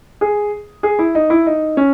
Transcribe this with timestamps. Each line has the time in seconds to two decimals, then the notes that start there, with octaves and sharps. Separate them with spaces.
0.21 G#4
0.83 G#4
0.99 E4
1.15 D#4
1.30 E4
1.46 D#4
1.77 C#4